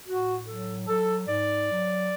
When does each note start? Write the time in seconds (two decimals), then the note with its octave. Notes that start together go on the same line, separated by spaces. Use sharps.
0.06 A2 F#4
0.46 F#3 A4
0.87 F#3 A4
1.28 G#2 D5
1.69 F#3